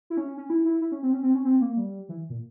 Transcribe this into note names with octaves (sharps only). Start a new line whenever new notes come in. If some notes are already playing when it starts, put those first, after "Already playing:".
E4
C#4
C#4
E4
E4
E4
C#4
C4
C#4
C4
C#4
C4
A#3
G3
E3
A#2